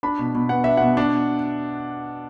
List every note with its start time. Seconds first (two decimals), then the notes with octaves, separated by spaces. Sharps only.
0.03 D4 B5
0.19 B2
0.35 B2
0.49 B3 F#5
0.64 D4 E5
0.77 B2 F#5
0.97 D4